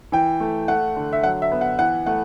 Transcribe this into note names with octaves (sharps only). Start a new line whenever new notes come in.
E3 G5
A3
A3 F#5
D3
E5
F#3 F#5
E5
B3
F#5
E3 F#5
A3 F#5